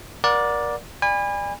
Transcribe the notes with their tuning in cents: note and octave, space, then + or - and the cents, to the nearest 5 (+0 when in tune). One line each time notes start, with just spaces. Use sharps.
A#4 +30 D5 +0 F#5 -25
D5 +15 G#5 -35 B5 +0